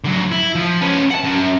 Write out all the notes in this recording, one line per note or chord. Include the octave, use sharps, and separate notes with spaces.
D3 F#3
E4
F3
C#4 B4
F#5 A5
F#2